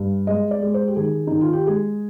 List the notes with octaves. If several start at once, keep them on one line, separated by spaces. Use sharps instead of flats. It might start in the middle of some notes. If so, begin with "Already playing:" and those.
Already playing: G2
G#3 D#5
D5
G#3
C5
G4
D#3 G#4
D#3 D#4
F4
G4
G#3 G#4